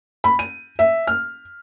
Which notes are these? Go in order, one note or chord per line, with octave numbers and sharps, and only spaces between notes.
B5
D#7
E5
F6